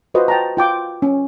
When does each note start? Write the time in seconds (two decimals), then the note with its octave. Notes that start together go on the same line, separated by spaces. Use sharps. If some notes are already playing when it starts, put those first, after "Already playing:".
0.14 F4 F#4 B4 C5 D#5
0.28 G5 A5 A#5
0.57 F4 G5 D6
1.02 C#4